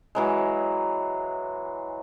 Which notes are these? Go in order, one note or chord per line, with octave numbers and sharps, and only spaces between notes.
E3 F#3 G#3